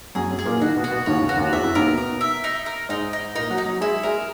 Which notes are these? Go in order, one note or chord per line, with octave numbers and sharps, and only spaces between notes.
F#2 F#3 G#4
F#2 F#3
G#4
A#2 A#3
D#3 D#4 F#4
B2 B3
F#4
B2 B3
D#2 D#3 C#5
C#2 C#3
F#4
D#2 D#3
E2 E3 E5
F#2 F#3
D#2 D#3 A#4
B2 B3
A#4
E5
D#4
A#4
G#2 G#3 D#4
D#4
A#2 A#3 D#4
F#3 F#4
D#4
F#3 F#4
G#3 E4 G#4
G#3 G#4 A#4